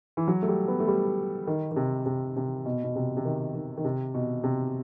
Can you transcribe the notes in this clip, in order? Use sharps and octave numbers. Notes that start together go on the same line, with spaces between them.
E3
F#3
A3
G3
B3
A3
G3
D#3
D#3
C3
C3
C3
B2
B2
C3
C3
D#3
D#3
D#3
C3
B2
C3